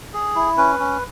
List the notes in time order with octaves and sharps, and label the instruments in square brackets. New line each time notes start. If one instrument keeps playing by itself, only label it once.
[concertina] G#4
E4
C#4 B4
C#4